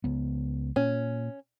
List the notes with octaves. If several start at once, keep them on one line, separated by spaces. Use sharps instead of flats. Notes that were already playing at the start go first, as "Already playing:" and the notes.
C#2 B3
A#2 C#4